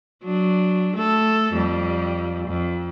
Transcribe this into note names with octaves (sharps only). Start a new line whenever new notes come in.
F#3 D4
A3 A4
F2 G3
F2